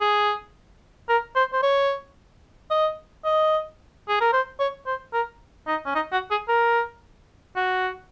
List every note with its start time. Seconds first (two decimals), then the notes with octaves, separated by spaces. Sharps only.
0.01 G#4
1.09 A#4
1.36 C5
1.53 C5
1.63 C#5
2.70 D#5
3.25 D#5
4.08 G#4
4.21 A#4
4.33 C5
4.59 C#5
4.87 C5
5.13 A#4
5.67 D#4
5.86 C#4
5.95 D#4
6.12 F#4
6.31 G#4
6.49 A#4
7.56 F#4